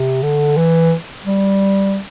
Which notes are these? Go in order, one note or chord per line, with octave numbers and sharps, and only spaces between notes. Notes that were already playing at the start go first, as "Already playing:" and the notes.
Already playing: C3
D3
E3
G3